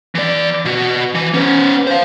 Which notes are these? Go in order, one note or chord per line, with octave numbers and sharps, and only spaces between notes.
E3 D5
B2 F#4
E3
B3 C#4
C5 F5